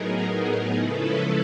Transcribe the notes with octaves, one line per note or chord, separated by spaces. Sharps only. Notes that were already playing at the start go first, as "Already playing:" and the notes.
Already playing: A2 F#3 B3 D#4 G#4 A#4
C#3 F3 G#3 C#4 E4 A4 B4